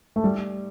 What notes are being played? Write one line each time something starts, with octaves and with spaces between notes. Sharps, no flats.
A3
G3